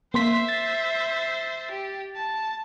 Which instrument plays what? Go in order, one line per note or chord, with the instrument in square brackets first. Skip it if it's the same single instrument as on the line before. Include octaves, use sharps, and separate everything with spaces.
[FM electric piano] A#3 C6 B6 [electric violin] C5 E5
[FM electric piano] A6
[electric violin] G4
A5